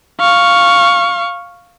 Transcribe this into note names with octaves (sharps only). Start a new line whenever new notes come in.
F5 C#6